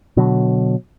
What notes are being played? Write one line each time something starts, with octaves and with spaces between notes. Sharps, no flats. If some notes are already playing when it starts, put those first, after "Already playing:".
B2 D3 F#3